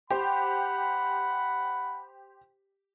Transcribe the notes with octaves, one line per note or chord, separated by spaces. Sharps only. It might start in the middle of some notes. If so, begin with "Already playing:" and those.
G4 C5 F#5 B5